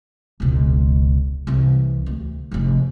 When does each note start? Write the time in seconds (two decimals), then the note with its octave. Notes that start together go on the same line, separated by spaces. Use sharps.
0.40 E1 C#2
1.47 C2 E3
2.06 D2
2.51 F1 F3